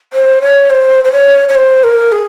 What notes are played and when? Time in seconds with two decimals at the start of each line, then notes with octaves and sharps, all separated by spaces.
0.13 C5
0.41 C#5
0.70 C5
1.04 C5
1.12 C#5
1.48 C#5
1.55 C5
1.83 A#4
2.12 G#4